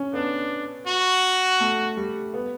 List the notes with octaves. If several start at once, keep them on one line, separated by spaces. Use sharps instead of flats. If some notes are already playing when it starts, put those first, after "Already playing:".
Already playing: C#4
B3 D4
F#4
A3
G3
B3